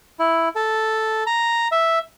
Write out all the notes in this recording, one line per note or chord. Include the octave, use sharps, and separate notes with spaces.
E4
A4
A#5
E5